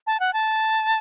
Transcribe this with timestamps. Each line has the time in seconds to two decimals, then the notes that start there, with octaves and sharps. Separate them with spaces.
0.07 A5
0.20 F#5
0.33 A5